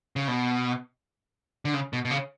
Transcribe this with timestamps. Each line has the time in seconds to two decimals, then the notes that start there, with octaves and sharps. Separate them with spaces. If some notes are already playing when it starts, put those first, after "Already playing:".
0.16 C#3
0.28 B2
1.65 D3
1.74 C#3
1.93 B2
2.05 B2
2.11 C#3